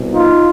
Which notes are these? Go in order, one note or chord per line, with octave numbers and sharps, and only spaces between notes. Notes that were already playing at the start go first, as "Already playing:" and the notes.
Already playing: C2 B2
D#4 F4